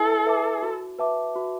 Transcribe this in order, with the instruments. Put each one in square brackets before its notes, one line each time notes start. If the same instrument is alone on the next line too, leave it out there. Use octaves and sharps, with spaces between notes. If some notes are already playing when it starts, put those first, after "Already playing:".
Already playing: [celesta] E4 B4 E5 A5 [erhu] A4
[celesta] B4 E5 A5 D6
F#4
B4 E5 A5 D6
F#4